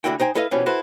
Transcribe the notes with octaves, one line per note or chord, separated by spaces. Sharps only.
D2 D3 E3 E4 F#4 G5
D#4 C5 G5 G#5
E4 A4 B4 D#5 F5
B2 E3 F3 G3 C#4
E4 F#4 A4 B4 C5